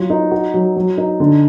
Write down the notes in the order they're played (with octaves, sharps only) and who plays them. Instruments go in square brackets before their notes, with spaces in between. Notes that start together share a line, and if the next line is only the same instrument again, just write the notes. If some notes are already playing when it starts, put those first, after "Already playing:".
Already playing: [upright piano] F#3 F4
D#4
F#4
F#3
F#3
D#4
D3